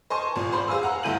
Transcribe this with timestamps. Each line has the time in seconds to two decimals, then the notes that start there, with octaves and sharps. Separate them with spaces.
0.10 C5 D#5 G#5 A5 C6 C#6
0.36 G#1 A#2
0.52 C5 B5 C6
0.68 G#4 C5 F5 G#5 E6
0.82 F5 F#5 A#5
1.03 G1 D2 E4 G6 D#7 F#7